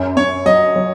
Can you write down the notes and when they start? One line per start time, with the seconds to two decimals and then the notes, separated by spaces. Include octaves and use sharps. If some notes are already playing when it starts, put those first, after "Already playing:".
Already playing: F#2
0.17 F#2 C#5
0.46 F#3 D#5
0.76 F#3